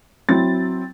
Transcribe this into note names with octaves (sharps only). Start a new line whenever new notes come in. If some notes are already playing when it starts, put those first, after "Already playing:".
F#3 C4 E4 A6